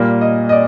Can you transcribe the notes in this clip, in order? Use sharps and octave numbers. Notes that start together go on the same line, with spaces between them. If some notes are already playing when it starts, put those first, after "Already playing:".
Already playing: A#2 G3 A#3
D#5
D#5
D5